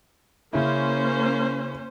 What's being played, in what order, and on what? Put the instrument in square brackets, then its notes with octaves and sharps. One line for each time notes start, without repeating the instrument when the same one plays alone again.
[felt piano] C#3 E4 [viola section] A#3 C#4 C5